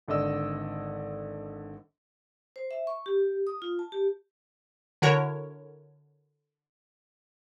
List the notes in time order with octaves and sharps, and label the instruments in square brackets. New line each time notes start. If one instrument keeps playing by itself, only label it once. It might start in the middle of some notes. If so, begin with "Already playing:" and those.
[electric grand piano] G#1 D3 D5 D#5 E6
[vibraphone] C5
E5
C#6
G4
D#6
F4
A5
G4
[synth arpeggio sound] D3 E4 F#4 A#4 C#5